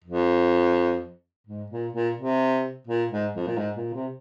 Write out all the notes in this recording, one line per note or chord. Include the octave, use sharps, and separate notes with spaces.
F2
G#2
A#2
A#2
C3
A#2
G#2
F2
A#2
G#2
A#2
C3